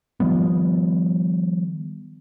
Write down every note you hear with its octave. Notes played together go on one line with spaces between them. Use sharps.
D#3 F3 G3 B3